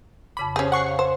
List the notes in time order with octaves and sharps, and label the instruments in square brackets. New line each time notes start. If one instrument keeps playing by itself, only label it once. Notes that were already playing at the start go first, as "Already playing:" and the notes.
[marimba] F2 C#3 D6 [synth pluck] B5
[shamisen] C#4 G#4 [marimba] G4 C5
[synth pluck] F#5 C#6 C7
[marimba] C#5 F5
[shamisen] C5